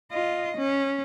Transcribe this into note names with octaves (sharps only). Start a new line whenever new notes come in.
F4 D#5
C#4